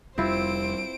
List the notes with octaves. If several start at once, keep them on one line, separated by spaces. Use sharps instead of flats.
F1 C3 G3 C4 E4 F4 C5 D7